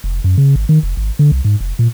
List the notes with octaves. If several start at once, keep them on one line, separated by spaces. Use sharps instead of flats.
F1
F#2
C#3
G#1
D#3
F1
G#1
D3
C2
G#2
F1
A#2